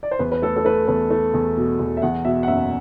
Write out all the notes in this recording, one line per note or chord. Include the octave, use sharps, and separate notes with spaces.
D5
C5
E2 B4
B4
A3 A4
A4
A3 B4
E2 B4
A3
E2
B2
E2
E5
E2 F#5
B2 E5
F#5
F#1 E5